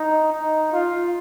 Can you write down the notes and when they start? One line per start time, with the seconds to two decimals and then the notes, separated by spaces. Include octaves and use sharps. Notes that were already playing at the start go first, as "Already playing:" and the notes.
Already playing: D#4
0.32 D#4
0.73 F4